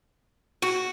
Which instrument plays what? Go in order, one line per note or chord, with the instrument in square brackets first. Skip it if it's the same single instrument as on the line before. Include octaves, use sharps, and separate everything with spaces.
[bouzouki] F#4